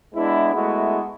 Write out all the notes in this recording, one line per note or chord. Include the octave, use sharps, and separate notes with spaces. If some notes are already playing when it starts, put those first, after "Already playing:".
G#3 B3 D4 E4
G#3 A3 B3 E4 F#4